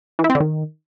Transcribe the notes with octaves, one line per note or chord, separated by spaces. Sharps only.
E3
E4
C4
D3
D#3